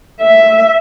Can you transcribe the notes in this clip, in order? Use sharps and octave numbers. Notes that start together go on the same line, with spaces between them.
E5